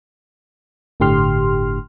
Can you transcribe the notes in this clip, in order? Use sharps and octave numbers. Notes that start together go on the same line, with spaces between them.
G1 A2 D3 G4 C6 F6